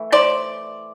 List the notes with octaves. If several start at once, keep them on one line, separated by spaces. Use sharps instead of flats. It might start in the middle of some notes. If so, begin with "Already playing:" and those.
Already playing: E3 A3
C5 D5